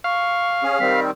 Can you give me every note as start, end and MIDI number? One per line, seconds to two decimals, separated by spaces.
0.04 1.00 77
0.04 0.65 85
0.63 0.79 61
0.63 0.79 68
0.80 1.11 51
0.80 1.11 55
0.80 1.11 60
0.80 1.00 95